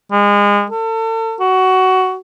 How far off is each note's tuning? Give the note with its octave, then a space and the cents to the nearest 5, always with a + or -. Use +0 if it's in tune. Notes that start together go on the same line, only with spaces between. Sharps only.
G#3 -30
A4 +40
F#4 +15